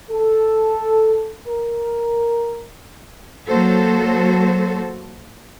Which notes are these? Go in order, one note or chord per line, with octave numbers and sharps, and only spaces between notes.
A4
A#4
F#3 A#3 F#4 A4 C5